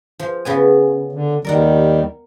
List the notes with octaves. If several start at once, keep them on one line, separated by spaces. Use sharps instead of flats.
F3
C#3 B3 G#5
D3
D#2 D#3 G3 A#4 D5 F#5